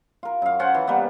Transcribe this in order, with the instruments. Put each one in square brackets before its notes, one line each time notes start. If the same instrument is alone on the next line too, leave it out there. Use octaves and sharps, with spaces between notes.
[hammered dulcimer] F4 A#4
F#2 F5
C#4 F4 C5 F#5
E3
G3 A#3 B3